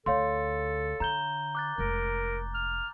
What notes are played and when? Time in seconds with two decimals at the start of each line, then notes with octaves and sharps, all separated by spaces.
0.06 D2 A4 C#5 F5 C6
1.00 D3 A#5 G6 G7
1.55 D6 F#6 A6
1.78 F1 G#3 A#4
2.55 F6